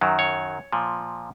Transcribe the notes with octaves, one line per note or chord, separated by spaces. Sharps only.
F#2 D#3 F#3
C#5
A#2 F3